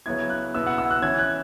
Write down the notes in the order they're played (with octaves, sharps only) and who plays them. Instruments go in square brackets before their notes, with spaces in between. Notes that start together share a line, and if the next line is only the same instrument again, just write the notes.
[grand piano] C#3 F#3 B3 E4 G#6
F#6
B2 B3 E4 E6
F#5
E6
F#6
E3 C#4 E4 G#6
F#6